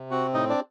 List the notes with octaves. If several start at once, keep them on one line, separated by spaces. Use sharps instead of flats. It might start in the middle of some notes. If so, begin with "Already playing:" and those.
Already playing: C3
C4 F#4 F#5
A2 D#4 D#5
D4 D5